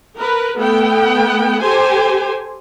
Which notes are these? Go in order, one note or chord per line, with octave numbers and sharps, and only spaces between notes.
A#4 B4
A3 B3 G5
G4 A4 C5 G#5